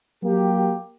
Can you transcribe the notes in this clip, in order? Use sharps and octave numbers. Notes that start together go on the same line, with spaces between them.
F#3 A#3 G4